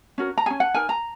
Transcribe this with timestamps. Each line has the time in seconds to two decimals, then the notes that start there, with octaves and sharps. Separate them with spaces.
0.18 C#4 F#4 A#4
0.38 A#5
0.46 G#4 G#5
0.50 C#4
0.60 F#5
0.74 D#4 A#4 G#5
0.89 A#5